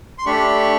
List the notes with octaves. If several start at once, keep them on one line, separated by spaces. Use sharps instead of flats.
C6
A3 D4 G4 B5 C#6